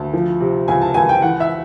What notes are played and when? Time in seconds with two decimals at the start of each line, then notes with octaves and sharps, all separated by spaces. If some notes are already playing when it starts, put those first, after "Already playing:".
Already playing: D2 A5
0.13 F3
0.40 C3
0.68 C#2 G#5
0.81 A5
0.94 C#2 G#5
1.09 G5
1.22 E3 F#5
1.40 E5